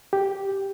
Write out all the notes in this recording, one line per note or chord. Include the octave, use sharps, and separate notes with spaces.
G4